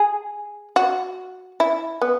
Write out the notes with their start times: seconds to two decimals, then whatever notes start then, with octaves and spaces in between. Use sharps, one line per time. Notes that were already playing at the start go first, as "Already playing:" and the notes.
Already playing: G#4
0.76 F#4
1.60 E4
2.01 B3